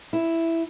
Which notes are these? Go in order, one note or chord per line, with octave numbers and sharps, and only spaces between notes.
E4